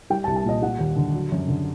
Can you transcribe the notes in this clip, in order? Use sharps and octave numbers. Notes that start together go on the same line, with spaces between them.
G3 G5
A5
C2
A5
A#2 D#5
G3 F#5
D#2
D3
F#3
F#2
D3